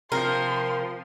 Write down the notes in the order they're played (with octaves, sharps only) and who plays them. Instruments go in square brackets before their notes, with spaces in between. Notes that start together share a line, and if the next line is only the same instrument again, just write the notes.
[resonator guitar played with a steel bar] C3 [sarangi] F3 [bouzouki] A#4 [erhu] C6